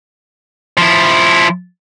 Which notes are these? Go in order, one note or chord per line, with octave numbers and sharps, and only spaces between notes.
F3 E4